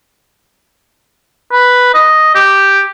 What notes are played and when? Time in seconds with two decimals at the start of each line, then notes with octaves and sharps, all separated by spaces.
1.52 B4
1.94 D#5
2.35 G4